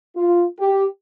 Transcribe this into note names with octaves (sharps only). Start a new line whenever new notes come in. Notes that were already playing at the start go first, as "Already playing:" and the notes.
F4
G4